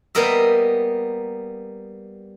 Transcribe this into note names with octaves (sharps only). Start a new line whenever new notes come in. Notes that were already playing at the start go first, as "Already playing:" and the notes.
G3 A#3 B3 A#4 D#5 E5